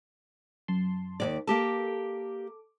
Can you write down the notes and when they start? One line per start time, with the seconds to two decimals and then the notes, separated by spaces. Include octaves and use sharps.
0.68 F#2 A5 C6
1.20 D#2 C3 D5
1.47 A#3 G4 A4 A5 D6